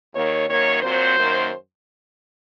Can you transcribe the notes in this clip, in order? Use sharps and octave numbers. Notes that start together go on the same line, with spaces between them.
D#2 D#3 A#3 C#5
F#2 D#3 A#3 C#5
A#2 F#3 C4 C5
F#2 D#3 A#3